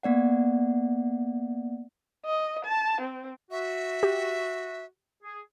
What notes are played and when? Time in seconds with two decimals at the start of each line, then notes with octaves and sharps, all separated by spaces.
0.03 A#3 B3 D5 F#5
2.26 D#5
2.65 A5
3.01 C4
3.51 F#4 E5
4.03 G4
5.23 G#4